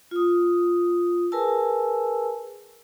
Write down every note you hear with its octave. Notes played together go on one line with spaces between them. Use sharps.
F4 D#6
G#4 A#4 B4 G#5 A5 E6